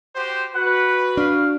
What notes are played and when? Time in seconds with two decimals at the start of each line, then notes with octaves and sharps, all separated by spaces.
0.16 F#4 G4 C5
0.55 F#4 B4 F#5
1.17 D4 F5